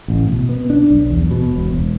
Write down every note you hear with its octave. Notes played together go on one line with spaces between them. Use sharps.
A1
B2
B3
D4
B1
E2
B2
E1
E1